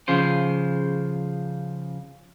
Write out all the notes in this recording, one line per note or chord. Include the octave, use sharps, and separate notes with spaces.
C#3 F3 C5